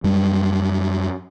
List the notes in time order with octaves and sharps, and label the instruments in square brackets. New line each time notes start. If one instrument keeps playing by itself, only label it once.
[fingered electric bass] F#2 G3